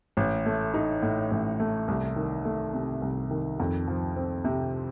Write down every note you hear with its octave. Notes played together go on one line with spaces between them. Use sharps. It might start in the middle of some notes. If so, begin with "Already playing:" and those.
A1
A3
D#4
A2
A1
A3
C2
D#3
A3
C3
C2
D#3
F2
F3
C4
C3